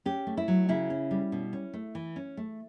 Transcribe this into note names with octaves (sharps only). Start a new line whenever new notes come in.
C#4 G4
A3
E4
F#3
C#3 E4
C#4
G3
B2
C#4
A3
E3
C#4
A3